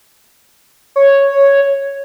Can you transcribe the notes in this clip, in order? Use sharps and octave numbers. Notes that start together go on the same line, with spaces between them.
C#5